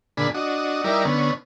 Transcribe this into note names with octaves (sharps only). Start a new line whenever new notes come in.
A#2 D3 D4 G#4 B5
D4 F#4 D#5
G3 D#4 E4 A#4 D5
D3 B3 C#4